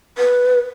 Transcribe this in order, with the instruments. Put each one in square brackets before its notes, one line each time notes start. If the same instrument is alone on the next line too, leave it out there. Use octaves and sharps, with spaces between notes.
[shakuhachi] B4